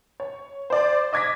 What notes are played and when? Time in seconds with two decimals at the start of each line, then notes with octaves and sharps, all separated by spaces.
0.20 C#5
0.70 C5 D5
1.13 D#5 D6 G#6 A#6 B6